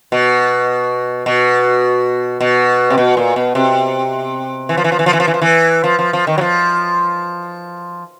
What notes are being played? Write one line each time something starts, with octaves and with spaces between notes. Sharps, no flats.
B2
B2
B2
C3
B2
A#2
B2
C3
E3
F3
E3
F3
E3
F3
E3
F3
E3
F3
E3
F3
F3
F3
D#3
F#3
F3